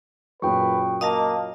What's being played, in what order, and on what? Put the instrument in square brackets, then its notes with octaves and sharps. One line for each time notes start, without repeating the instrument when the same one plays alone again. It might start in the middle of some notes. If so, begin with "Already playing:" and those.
[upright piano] F#2 A#2 [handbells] G#4 G5 C#6 [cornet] B4
[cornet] A#3 [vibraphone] D#5 F5 A5 [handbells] D#6 A#6